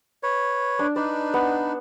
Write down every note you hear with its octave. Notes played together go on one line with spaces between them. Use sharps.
B4 C#5
D4
D4 D#4 B4 D5
B3